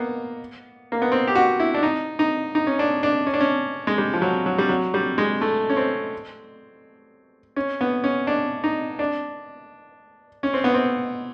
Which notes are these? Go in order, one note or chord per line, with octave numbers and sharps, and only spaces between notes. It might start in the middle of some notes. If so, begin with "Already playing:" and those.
Already playing: A#3 B3
A#3
B3
C4
G4
F#4
E4
D4
D#4
D#4
D#4
C#4
D4
D4
C#4
D4
C#4
G#3
G3
F3
F#3
F#3
G3
F#3
G3
G#3
A3
C#4
C4
C#4
B3
C#4
D4
D#4
D4
C#4
C4
B3
C4